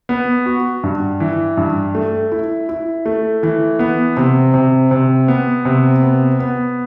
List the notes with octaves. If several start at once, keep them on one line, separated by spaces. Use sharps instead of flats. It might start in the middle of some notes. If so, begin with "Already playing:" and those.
B3
F#4
G2
E3
G2
A3
E4
E4
A3
E3
B3
C3
C3
C3
B3
C3
B3
B3